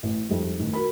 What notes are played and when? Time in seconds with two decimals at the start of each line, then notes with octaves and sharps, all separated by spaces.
0.03 A1
0.29 F2 G#2 G3
0.59 A1 D#3
0.74 F#4 A#4 B5